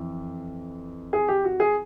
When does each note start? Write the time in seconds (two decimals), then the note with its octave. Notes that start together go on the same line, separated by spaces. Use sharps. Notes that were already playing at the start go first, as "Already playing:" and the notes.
Already playing: F2 E3
1.13 G#4
1.28 G4
1.44 F#4
1.60 G#4